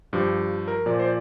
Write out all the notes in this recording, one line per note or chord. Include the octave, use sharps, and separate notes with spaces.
G2 F3 G4
A#4
A#2 F3 D5
C5
D5